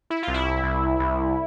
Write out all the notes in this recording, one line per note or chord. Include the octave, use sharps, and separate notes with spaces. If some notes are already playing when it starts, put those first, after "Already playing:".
E4
C2 F4
E4
C2
C2